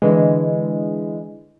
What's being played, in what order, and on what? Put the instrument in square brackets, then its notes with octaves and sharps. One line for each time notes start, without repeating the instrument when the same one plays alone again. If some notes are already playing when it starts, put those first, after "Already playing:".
[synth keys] D3 E3 G#3